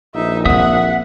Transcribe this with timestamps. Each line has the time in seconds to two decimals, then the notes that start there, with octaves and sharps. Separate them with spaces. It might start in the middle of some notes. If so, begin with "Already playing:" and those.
0.14 A#1 D#4 E5
0.45 A#3 C4 E5 F#5 D#6